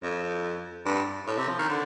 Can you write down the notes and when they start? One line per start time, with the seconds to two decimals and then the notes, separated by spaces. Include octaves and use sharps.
0.03 F2
0.86 G2
1.27 A2
1.37 C3
1.48 F3
1.58 D#3
1.69 D3